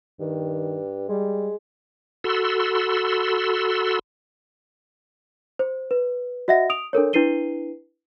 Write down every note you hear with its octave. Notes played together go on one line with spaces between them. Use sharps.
G2 D#3
G3 G#3
F#4 A4 B5 C6 E6
C5
B4
F#4 D#5 E5 F#5 A#6
D#6 D7 F7
D4 A4 A#4 C#5
D4 E4 B4 C7 D#7 G7